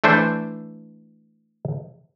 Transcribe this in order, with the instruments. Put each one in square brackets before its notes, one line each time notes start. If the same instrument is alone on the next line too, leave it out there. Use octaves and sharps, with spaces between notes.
[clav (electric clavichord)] E3 A3 D4 C5